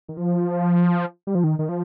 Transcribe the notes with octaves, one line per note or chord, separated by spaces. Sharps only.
D#3
F3
G3
F3
D#3
D#3
F3